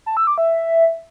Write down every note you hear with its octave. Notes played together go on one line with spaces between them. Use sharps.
A5
E6
D6
E5